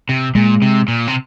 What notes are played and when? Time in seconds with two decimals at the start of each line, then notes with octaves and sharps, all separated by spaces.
0.09 C3
0.35 A#2 G#3
0.62 C3
0.88 A#2
1.07 C3